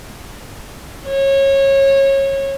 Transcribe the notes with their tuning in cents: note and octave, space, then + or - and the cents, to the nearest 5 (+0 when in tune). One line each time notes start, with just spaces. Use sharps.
C#5 -25